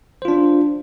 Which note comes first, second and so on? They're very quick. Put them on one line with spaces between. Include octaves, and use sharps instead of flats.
C5 F4 D4